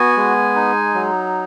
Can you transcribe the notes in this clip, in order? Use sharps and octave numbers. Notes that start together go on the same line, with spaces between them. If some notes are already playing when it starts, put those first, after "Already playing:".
Already playing: B3 F#4 G#5
G#3
D#4
F#3